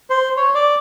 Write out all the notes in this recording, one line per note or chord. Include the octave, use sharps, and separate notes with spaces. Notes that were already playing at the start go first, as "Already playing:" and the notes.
C5
C#5
D5